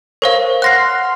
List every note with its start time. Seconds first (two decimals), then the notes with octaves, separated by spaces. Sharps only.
0.22 A#4 C5 C#5 F5
0.62 F#5 C6 F6 F#6 A#6 C7